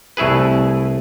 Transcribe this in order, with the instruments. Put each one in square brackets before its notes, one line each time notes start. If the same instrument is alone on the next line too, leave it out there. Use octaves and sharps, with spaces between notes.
[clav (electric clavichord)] C2 A3 E4 G#4 B4